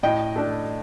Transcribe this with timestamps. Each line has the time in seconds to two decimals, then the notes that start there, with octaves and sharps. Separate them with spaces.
0.03 A2 D#5 G5
0.36 A3 D4